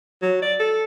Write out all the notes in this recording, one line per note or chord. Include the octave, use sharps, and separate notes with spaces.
F#3
D5
A4